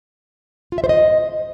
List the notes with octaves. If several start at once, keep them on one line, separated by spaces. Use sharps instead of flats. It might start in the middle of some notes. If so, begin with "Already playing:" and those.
F4
E5
C5
D#5